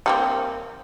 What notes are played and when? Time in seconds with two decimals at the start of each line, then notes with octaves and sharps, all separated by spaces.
0.06 G3 A#3 C4